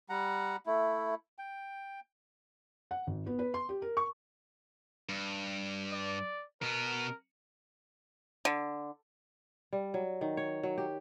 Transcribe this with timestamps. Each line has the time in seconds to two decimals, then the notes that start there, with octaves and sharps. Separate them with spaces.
0.09 G3 F#5 A#5
0.66 A3 E4
1.38 G5
2.91 F#5
3.07 G#1
3.26 B3
3.39 B4
3.54 C6
3.69 G4
3.82 A#4
3.97 C#6
5.09 G2
5.93 D5
6.62 B2 B3 A#4
8.45 D3
9.73 G3
9.94 F#3
10.21 D#3
10.37 C#5
10.63 F#3
10.78 G4